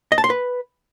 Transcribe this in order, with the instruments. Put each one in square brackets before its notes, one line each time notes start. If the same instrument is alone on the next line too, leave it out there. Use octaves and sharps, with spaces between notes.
[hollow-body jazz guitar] D#5
A5
C6
B4